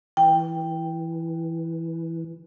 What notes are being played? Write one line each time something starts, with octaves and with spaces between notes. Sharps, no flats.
E3 G5